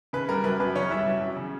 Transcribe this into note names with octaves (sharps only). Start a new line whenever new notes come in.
C#3 B4
G3 A#4
F#2 B4
F#2 B4
C#3 C#4 C#5
G3 E4 E5
F#2
F#2
C#3